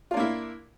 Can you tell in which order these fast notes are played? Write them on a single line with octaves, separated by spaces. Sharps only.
F4 D4 A#3 E4